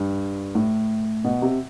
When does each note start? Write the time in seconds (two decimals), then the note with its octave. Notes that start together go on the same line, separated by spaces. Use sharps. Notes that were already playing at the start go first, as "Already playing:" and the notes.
Already playing: G2
0.55 A2
1.24 B2
1.42 C3